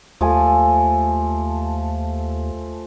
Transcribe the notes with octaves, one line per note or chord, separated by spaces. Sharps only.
D#2 F3 A3 G#5